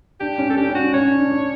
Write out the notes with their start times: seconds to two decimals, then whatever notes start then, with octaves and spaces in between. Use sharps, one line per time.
0.20 D4 G4
0.38 C#4
0.50 A4
0.57 D4 G4
0.69 C#4
0.75 F#4
0.81 D4
0.94 C#4 C#5
1.06 D4
1.18 D4
1.31 D4